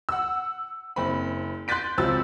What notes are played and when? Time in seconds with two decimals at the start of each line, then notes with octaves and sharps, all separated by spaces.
0.09 F#5 E6
0.96 F#1 C4 B5
1.68 C6 F#6 G6 A6 B6 D7
1.98 C#2 F3 F#3 C4 E6 A6